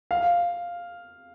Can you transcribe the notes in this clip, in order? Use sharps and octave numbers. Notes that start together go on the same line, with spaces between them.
F5